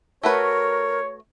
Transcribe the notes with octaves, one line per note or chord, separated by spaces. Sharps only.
A3 F#4 A#4 B4 C#5